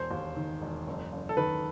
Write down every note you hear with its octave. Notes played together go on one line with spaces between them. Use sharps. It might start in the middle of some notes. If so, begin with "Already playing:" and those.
Already playing: E1 C5
D#2
D#3
E1
F#1
F#1
A4
D#3 B4